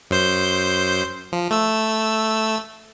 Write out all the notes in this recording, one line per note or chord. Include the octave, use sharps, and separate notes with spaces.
F#2 C5 G6
F3
A3 E6